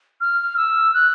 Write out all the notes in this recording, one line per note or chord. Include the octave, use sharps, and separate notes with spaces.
F6
E6
F#6